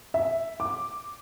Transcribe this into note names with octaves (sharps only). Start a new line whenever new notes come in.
E5
D6